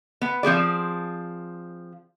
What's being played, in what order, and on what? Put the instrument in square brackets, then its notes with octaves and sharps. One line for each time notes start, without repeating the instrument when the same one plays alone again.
[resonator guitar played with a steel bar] B3
F3 C4 G#4 D5